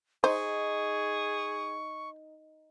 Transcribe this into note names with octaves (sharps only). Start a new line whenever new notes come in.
D#4 G#4 C5 C#6